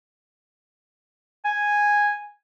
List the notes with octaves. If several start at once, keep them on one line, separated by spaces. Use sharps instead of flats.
G#5